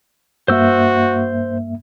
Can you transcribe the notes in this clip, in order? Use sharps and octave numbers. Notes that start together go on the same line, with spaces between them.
G2 A#3 F#4 C5 E5 E6